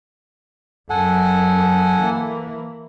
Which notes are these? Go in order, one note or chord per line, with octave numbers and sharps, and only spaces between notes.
F#2 A4 F#5 G#5
E3 A#3